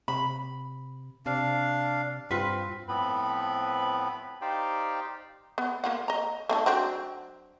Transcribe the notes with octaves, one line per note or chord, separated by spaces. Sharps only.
C3 B5
C3 D4 F5
G2 C4 F4 B4
A2 F3 B3 C4 B4 B5
D#4 G4 C5 D5 F5 G5
B3
A#3 F4 F#5
D#5 A#5
A3 D#4 A4
F#3 C4 D4